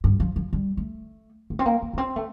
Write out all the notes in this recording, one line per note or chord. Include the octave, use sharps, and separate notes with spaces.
G2
F3
F3
G3
A3
A3
C4
A#3
A#3
A#3
C4
A3